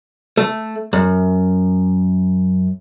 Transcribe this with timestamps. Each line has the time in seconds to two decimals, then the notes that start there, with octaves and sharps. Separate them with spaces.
0.37 A3
0.93 F#2